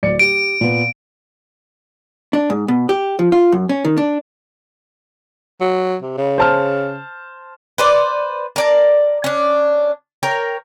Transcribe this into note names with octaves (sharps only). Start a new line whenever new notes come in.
D1 D5 C#7
G4 D7
A#2 B3
D4
G#2
B2
G4
F3
F4
F#2
C#4
D#3
D4
F#3
C3
C#3
C5 A5 F6
B4 C5 D5
A#4 D5 A5
C#4 D4
A#4 C#5 G5